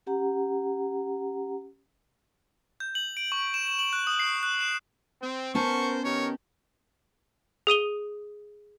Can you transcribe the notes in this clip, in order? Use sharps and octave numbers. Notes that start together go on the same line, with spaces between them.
C#4 G4 F#5 A#5
G6
F#7
D7
C#6
E7
E7
F#7
F#6
D#6
C7
F#6
E7
C4
B3 C#4 A#4 C5 A5 C#6
D#3 G4 A#4 C#5
G#4 D#6 D#7 G7